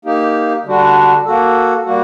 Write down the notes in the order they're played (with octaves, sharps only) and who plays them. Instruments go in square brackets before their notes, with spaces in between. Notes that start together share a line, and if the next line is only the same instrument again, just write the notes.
[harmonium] A#3 D#4 G4
D3 G3 D4 F#4
A#3 F#4 A4
G3 A#3 F#4